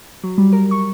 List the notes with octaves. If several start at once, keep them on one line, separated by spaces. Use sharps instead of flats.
F#3
G3
A#4
C#6